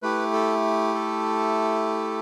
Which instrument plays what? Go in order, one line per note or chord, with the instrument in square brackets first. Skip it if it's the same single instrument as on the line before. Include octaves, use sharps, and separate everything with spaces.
[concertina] A3 E4 G4 B4
A4
A4